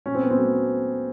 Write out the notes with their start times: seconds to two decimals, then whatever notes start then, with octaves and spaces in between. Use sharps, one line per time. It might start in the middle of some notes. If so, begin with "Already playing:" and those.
0.06 A#2 C#4
0.14 C4
0.23 B3
0.30 C4
0.36 F#3 A3